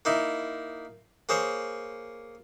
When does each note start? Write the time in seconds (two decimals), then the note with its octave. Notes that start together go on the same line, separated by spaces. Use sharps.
0.05 A#3 D#4 E4
1.29 A#3 G#4 C5 C#5